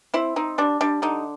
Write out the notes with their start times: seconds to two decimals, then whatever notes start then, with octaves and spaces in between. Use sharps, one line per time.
0.14 C4 E4
0.36 C4 D#4
0.58 G3 D4
0.81 G3 D4
1.02 D3 D#4